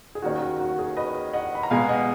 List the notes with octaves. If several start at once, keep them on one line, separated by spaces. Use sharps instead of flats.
G#4
D#2 D#3 A#3 C#4 F#4
F#4
F#4
G#4
B4 D#5
D#5 F#5
B5
A#5
B2 G#3 B3 F5 G#5
D#5 F#5